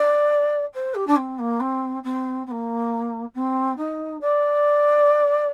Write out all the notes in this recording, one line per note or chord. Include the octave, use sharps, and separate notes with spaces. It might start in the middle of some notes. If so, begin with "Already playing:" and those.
Already playing: D5
C5
G4
D4
C4
A#3
C4
C4
C4
A#3
C4
D#4
D5